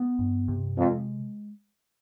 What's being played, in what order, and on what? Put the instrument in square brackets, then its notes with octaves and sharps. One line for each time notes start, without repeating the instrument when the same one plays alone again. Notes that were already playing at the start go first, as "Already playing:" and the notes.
Already playing: [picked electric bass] B3
G2
C3
[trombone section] F2 [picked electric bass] G#3